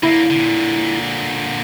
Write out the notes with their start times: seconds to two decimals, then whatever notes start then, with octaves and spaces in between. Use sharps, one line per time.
0.03 D3 A#3 E4
0.30 A#2 D3